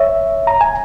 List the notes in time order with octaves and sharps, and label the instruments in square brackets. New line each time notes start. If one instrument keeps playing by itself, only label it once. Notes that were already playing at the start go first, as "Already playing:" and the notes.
Already playing: [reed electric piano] C#5 E5
A#5
G#5